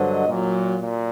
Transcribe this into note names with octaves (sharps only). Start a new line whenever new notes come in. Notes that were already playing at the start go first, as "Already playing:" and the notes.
Already playing: G2 D3 F#3 C5 D#5
A#2 F#3
A#2